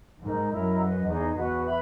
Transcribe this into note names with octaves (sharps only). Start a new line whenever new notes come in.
G#2 D#4 A#4 D#5
F#2 E4 A#4 D#5 A#5
B4 D#5 F#5
E2 D#4 G#4 D#5
E2 F#4 B4 F#5
B4 E5 B5